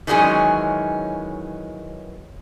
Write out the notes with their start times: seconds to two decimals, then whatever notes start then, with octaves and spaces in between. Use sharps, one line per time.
0.07 D#3 E3 F#3 G#3 C#4